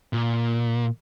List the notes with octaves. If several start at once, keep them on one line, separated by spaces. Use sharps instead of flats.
A#2